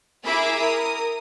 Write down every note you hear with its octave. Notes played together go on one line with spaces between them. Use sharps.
E4 G#4 A#4 E5 B5 D6
A#4 D#6